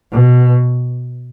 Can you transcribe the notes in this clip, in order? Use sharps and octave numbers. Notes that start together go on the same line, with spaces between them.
B2